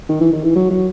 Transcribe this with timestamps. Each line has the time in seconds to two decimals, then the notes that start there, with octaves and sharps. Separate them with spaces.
0.09 D#3
0.21 E3
0.32 D#3
0.44 E3
0.55 F#3
0.71 F#3